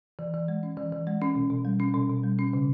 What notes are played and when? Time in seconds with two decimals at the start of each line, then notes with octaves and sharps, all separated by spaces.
0.19 E3
0.34 E3
0.48 G#3
0.63 C#4
0.77 E3
0.92 E3
1.07 G#3
1.22 C#4
1.35 B2
1.50 B2
1.65 G3
1.80 C#4
1.94 B2
2.10 B2
2.24 G3
2.39 C#4
2.53 C#3